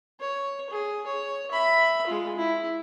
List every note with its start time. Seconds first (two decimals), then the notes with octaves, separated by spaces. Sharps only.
0.20 C#5
0.70 G#4
1.07 C#5
1.52 E5 B5
2.07 G#3 F4
2.36 E4